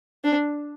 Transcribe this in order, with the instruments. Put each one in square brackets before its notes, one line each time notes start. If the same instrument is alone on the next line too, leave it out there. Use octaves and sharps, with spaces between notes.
[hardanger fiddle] D4